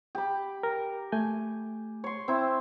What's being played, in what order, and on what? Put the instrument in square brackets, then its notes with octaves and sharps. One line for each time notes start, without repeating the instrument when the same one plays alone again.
[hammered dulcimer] G4 B5
[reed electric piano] A#4
A3 G#5 G6
[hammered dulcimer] C#5 C6
C4 E4